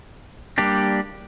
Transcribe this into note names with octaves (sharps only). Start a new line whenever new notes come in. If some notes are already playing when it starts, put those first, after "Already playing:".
G3 A#3 D4 G4